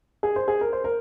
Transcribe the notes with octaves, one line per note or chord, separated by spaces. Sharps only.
G#4
C5
G#4
A#4
C5
A#4